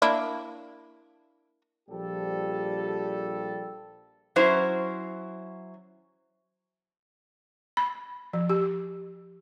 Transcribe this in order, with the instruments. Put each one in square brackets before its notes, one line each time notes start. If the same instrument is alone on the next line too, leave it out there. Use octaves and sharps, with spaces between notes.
[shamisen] A#3 D4 E4
[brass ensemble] A#1 F3 G3 G4 A4
[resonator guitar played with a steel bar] F#3 C#4 E4 C5
[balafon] B5
F3
G4